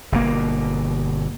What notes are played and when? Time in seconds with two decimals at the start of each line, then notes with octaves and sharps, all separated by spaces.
0.12 G1 B2 A#3